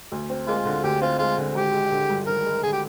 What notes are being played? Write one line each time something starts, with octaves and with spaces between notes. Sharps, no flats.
D2
C4
G#3 A#3 F4
D3
D2 G4
C4 F4
G#3 F4
D3
G#1 G4
G#3
D3
G2
G#1 A#4
G#3
D3 G#4
G4